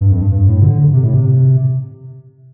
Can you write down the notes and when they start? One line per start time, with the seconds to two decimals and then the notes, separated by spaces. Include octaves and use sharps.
0.01 G2
0.11 F2
0.21 G2
0.32 G2
0.47 A2
0.62 D3
0.93 C3
1.03 A2
1.14 C3